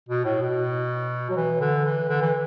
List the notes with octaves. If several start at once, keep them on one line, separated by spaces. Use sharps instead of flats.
B2
A2
B2
F#3
E3
D3
E3
D3
E3